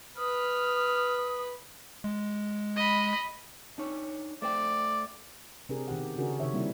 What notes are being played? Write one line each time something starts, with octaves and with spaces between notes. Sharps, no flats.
B4 D#6 F6
G#3
D#5 B5
D4 D#4 C#5
A3 C5 D5 G5
C3 C4 D4 G4 G#4 A#4
B2 D#3 G4 F#5
C#3 C#4 D4 F#4 G#4 A#4
C3 D#3 C#5 E5
G3 A#3 C4 D4 E4